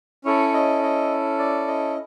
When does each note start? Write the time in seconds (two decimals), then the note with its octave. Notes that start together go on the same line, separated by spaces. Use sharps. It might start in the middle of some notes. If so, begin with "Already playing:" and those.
0.25 C#4 E4 A4 C#5
0.54 D#5
0.83 D#5
1.39 D5
1.68 D#5